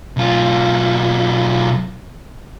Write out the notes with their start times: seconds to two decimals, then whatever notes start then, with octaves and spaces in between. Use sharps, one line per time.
0.17 B1 F4